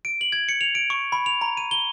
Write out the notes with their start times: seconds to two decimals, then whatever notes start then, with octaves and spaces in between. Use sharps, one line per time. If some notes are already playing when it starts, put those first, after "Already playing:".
0.05 D7
0.21 F#7
0.32 G#6
0.49 C#7
0.61 F7
0.75 D7
0.90 C#6
1.12 B5
1.26 F7
1.41 A#5
1.57 D#7
1.71 G7